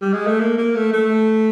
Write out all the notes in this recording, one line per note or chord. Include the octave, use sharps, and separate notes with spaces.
G3
G#3
A3
A#3
A#3
A3
A3